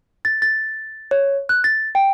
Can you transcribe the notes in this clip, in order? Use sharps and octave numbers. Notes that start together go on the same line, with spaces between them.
A6
A6
C#5
F#6
A6
G5